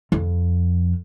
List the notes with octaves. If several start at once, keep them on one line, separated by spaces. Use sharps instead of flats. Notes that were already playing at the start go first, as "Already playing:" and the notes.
F2